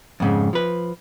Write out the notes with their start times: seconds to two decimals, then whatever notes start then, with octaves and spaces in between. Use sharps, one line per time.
0.20 F2 G#2 C#3
0.53 F3 B4